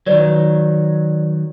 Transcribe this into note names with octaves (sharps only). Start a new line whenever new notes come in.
D#3 F#3 B4 C#5 D5